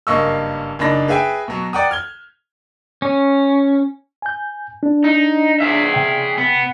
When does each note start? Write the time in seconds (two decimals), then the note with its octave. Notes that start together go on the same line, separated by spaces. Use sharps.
0.07 F#1 G2 A#3 D#5 C#6 E6
0.79 F#1 D4 D#4 B5 A#6
1.08 G#4 B4 E5 G5 G#5
1.48 B2 F#3
1.73 D5 F#5 G5 A#5 D#6
1.91 F6 G#6 G7
3.02 C#4
4.22 G#5 G6
4.83 D4
5.04 D#4
5.61 G#4 E5
5.94 C3 G5
6.38 B3